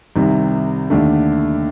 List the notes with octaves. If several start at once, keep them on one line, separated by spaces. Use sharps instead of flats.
C2 C3 D#3
D#2 D3 A3 D4